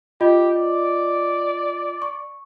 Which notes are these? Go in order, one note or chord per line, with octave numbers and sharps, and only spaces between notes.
F4 G4 D#5
D5
C#6